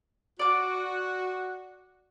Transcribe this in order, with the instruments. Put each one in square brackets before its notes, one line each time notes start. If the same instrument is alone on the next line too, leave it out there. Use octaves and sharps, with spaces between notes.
[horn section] F#4 [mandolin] D5 D6